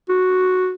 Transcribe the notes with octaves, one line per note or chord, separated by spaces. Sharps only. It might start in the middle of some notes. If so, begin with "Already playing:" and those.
F#4